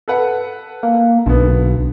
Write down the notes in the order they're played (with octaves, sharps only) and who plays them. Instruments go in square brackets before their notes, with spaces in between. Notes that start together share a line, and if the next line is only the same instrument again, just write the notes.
[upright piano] A4 B4 F#5
[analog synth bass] A#3
[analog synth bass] B1 [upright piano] D3 B3